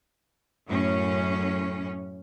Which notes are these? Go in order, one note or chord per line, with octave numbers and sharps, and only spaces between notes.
F#2 A2 C#4